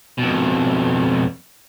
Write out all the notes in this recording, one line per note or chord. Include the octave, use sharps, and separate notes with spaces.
F2 B2